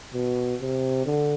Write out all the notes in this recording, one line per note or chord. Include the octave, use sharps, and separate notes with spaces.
B2
C3
D3